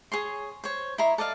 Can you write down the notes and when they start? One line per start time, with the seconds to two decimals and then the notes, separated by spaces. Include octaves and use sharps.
0.12 G#4 C#5 C6
0.64 C5 C#5
0.98 E4 D#5 A#5 C6
1.18 A4 D5 D#5 F5